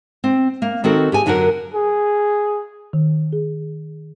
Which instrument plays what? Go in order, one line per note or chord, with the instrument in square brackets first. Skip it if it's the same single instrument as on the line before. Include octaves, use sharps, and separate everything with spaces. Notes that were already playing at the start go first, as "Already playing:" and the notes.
[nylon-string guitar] C4
A#3
D#3 C4 F#4 A4 A#4
G4 G#4 G#5
F#2 D3 F#3 F#4 G4 A#4
[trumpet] G#4
[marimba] D#3
G#4